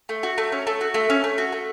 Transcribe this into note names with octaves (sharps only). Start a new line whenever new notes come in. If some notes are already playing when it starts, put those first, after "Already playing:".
A3
F#4
A3
C#4
A3
F#4
A3
C#4
A3
F#4
A3